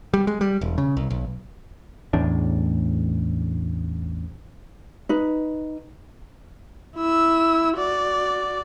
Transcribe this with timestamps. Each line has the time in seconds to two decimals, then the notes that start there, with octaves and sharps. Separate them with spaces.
0.14 G3
0.27 G#3
0.41 G3
0.61 E1
0.78 C#3
0.97 C2
1.10 B1
2.13 A1 E2 A2 D4
5.09 D#4 B4
6.96 E4 E6
7.77 F#4 D5